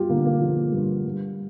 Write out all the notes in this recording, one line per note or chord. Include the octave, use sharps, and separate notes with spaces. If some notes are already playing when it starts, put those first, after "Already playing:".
Already playing: G2 F4 G4
D3 A#3
A#3
F3
G2
G2